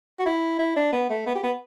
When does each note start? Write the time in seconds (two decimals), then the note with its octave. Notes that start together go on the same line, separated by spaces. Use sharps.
0.19 F#4
0.25 E4
0.59 E4
0.76 D4
0.92 B3
1.10 A3
1.27 B3
1.35 G4
1.44 B3